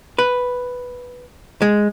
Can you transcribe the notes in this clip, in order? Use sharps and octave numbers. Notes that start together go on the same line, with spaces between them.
B4
G#3